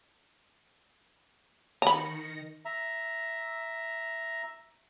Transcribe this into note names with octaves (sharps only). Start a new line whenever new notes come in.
D#3 A#5 B5 A#6 C#7
E5 A#5